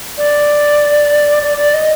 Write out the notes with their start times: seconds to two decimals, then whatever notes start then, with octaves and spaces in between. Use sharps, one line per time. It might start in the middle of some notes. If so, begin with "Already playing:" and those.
0.18 D5
1.43 D5
1.58 D5
1.74 D#5